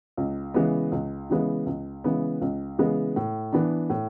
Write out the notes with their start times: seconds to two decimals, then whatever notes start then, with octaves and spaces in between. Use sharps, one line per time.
0.17 C#2
0.54 C#3 E3 G#3 B3
0.92 C#2
1.30 C#3 E3 G#3 B3
1.66 C#2
2.04 C#3 E3 G#3 B3
2.41 C#2
2.79 C#3 E3 G#3 B3
3.16 A2
3.53 E3 B3 D4
3.90 A2